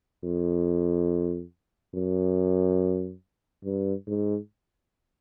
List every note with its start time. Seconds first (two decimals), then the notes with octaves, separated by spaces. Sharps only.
0.24 F2
1.95 F#2
3.64 G2
4.07 G#2